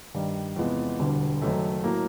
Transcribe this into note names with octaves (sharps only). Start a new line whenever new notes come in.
G2 D#3 G3
E2 C3 F3 G#3 B3
E1 D2 D3 G3
F#1 F#2 D#3 F#3 A3
A2 F#3 A#3